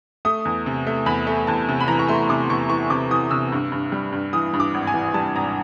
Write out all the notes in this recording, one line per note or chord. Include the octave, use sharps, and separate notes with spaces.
A3 D#6
E2
C3
A3
E2 B5
A3
E2 A5
C3
B5
E3 A#5
C#6
A3 C6
C3 D6
E2 C#6
E3 C#6
C3 D6
E3 D#6
C3 E6
G2
G2
G3
G2
E3 D#6
G2
D6
G#1
G#5
E3
G3 A5
G#1 A#5